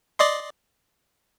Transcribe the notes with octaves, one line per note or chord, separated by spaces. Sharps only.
D5 D#5 C6